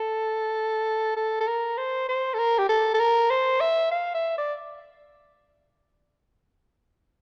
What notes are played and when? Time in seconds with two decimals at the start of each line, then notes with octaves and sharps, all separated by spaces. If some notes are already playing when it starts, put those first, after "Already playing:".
Already playing: A4
1.17 A4
1.41 A4
1.47 A#4
1.78 C5
2.09 C5
2.34 A4
2.39 A#4
2.58 G4
2.69 A4
2.94 A4
3.00 A#4
3.30 C5
3.61 E5
3.91 F5
4.15 E5
4.38 D5